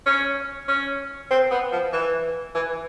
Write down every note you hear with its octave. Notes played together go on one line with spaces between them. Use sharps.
C#4
C#4
C4
B3
F3
E3
E3